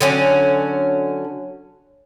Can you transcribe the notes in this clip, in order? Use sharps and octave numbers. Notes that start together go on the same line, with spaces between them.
D3 F#3 C#4